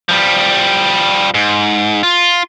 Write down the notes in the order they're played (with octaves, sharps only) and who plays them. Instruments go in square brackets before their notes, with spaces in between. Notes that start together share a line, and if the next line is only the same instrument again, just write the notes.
[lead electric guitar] F3 G3
G#2
F4